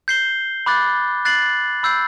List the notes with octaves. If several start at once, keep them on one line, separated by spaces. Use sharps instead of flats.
G6 C7 G7
B5 D6 F#6 A6
F#6 A6 C7 F#7
B5 E6 G6 C7